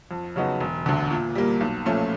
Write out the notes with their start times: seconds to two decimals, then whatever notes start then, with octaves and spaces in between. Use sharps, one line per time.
0.11 F2
0.36 C#3 F#3 B3 D#4
0.60 E1
0.86 D2 D3
1.10 A#2
1.35 G3 A#3
1.61 B1
1.85 A#2 F3 A3 C#4